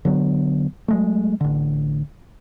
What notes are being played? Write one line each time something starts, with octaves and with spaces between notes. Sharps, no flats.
D3 F#3 B3
F#3 G#3 A3
A1 D3